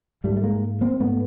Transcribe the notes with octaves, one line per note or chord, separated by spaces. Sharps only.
G#2 G3 A3
A3
G#3 A#3
A#3 C4
G#2 A3 B3